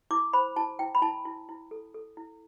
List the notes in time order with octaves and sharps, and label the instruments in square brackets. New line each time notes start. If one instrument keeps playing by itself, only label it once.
[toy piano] E4 D6
C5 B5
E4 A5
E4 G5
B5
E4 A5
E4
E4
A4
A4
E4